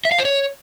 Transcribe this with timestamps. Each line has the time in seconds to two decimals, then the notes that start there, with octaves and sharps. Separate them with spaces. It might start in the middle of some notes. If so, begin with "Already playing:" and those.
0.05 E5
0.12 F5
0.18 C5
0.25 C#5